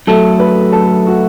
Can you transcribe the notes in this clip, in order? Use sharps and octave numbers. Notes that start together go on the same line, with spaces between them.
F#2 F#3 A3 A4
B4
A4
F#4